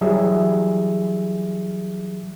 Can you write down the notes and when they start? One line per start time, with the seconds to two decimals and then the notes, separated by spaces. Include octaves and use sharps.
0.01 E3 F#3 G3 G#4 E5